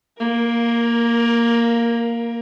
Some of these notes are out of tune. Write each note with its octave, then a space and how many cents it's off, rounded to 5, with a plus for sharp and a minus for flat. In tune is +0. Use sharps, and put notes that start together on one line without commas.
A#3 +0 A#4 +20